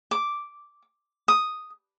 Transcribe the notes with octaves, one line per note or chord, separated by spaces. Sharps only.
D6
D#6